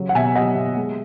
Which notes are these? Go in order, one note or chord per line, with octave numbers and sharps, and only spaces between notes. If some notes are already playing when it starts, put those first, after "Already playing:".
Already playing: C#3 F#3
F#5
B2 E5 G#5
F#3 D#5 F#5
B2
G#3